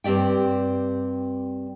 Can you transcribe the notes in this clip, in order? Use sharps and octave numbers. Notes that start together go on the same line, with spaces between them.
G2 C4 G4 D5 G5